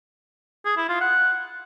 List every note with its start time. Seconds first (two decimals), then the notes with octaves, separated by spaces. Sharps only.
0.65 G#4
0.77 E4
0.89 F4
1.01 F#5